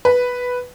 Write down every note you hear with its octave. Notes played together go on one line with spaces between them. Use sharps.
B4